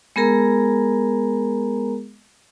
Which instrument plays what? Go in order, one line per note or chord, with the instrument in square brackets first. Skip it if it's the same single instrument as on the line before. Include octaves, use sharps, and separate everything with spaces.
[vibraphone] G#3 B3 G#4 A#4 A#5